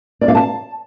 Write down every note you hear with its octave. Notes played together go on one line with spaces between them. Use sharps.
D5
F5
A5